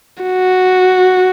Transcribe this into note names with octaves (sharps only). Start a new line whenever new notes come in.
F#4